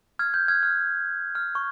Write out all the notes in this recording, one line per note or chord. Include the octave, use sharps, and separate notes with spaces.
F6 G#6
G6
F6 G#6
F6
F6
C#6